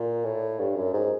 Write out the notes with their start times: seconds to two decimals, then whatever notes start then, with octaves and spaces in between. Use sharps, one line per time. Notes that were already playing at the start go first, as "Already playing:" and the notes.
Already playing: A#2
0.24 A2
0.59 G2
0.77 F#2
0.93 G#2